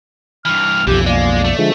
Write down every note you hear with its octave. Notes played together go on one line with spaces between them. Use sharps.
G2 E3 F6
B1 F2 E3 G4
G#3 A#3 D5
A3
D3 F3 G#3 E5